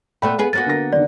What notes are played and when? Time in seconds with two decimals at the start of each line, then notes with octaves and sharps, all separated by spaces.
0.22 A#2 A3 B3 D5 G5 B5
0.39 B3 G#4 B4 G#5
0.53 A#3 B3 F#4 A6
0.66 D3 A#4 A#6
0.93 D3 D#3 D5